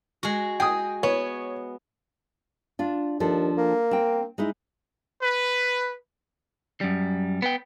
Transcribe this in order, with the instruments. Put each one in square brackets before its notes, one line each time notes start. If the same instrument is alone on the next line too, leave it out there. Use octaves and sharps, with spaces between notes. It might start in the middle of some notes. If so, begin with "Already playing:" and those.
[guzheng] G#3 F#4
[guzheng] G#4 [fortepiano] G5 D#6
[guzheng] B3 [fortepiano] C#5
[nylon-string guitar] D4 F4
[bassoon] D#2 [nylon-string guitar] F3 D4 A4
[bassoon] A#3
[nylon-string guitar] C4 G5
G#3 D#4 E4
[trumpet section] B4
[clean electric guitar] F#2 G3
B3 B4 G5